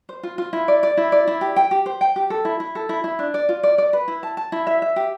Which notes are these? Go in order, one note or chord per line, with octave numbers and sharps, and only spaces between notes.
C5
F4
F4
E4
D5
D5
E4
D5
E4
G4
G5
G4
C5
G5
G4
A4
E4
E4
A4
E4
E4
D4
D5
F4
D5
D5
B4
E4
A5
A5
E4
E5
E5
G4